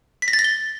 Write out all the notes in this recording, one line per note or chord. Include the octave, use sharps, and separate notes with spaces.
B6
A#6
A6
A#6
G7